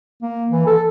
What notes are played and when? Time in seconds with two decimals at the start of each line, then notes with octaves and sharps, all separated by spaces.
0.22 A#3
0.50 E3
0.67 A4